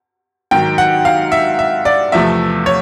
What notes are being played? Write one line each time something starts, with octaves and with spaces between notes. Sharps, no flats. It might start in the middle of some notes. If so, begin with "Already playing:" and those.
G#2 D#3 F#3 G5
F#5
F5
E5
E5
D5
E2 C3 F3 A3 E5
C#5